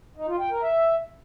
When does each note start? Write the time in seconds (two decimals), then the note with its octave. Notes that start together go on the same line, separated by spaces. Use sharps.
0.16 D#4
0.28 F4
0.39 G5
0.51 A#4
0.62 E5